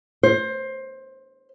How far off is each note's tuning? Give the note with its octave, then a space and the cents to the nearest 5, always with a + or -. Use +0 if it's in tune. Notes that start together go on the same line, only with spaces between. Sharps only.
C5 +20